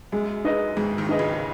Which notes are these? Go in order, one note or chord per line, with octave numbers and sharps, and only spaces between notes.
F#2 G#3
D#4 G#4 B4 D#5
G#1 G#2 G#3
D#2 D#3
D#4 G#4 B4 D#5
C#2 C#3